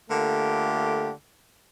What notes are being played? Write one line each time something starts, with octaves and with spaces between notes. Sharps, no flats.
D3 A3 A#3 F4 G4